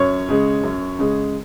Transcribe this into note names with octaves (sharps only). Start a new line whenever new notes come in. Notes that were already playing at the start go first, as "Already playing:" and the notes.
Already playing: F#2 C#5
C#3 G#3
F#2
C#3 G#3